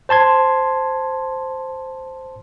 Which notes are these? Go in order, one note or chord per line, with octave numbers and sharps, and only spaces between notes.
C5 A5 C6 G#6